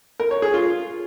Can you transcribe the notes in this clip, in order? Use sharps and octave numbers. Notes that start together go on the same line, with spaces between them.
A#4
C#5
G#4
F4